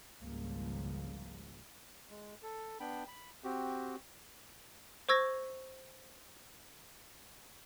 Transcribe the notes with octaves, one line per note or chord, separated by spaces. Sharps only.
G#1 C#2 C#3 F3 G3 A#3
G#3
A4
B3 D4 G5 B5
B5
C4 F#4 G4
C5 C#6 E6 G#6 A#6